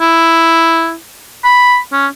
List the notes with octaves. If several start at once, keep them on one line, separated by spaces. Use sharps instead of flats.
E4
B5
C#4